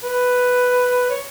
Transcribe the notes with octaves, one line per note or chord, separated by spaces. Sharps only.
B4
C#5